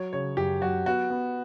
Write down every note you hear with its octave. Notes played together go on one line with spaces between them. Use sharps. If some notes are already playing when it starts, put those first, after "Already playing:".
Already playing: F#3 C#5
C#3 C#5
F#2 G4
F#3 F#4
B3 F#4
B3